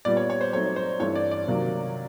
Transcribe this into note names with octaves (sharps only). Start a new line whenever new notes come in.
A#2 G3 B3 D5
C#5
C#5
C5
F#3 A3 C4 D#4 C#5
C5
G2 E3 A3 C4 C#5
D5
D5
C3 D#3 F#3 A#3